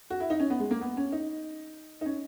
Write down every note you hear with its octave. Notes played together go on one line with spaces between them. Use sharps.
F#4
E4
D#4
C#4
B3
G#3
A#3
B3
C#4
D#4
D#4
C#4